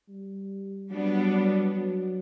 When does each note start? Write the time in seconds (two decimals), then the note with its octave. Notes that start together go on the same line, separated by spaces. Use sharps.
0.08 G3
0.90 F#3 G3 B3 D4
1.73 F#3